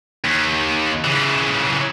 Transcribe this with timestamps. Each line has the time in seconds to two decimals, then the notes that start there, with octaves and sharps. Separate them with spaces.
0.25 D#2
1.04 C#3 E3